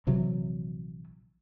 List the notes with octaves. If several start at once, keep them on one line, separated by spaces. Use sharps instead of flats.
A#1 C3 E3 F#3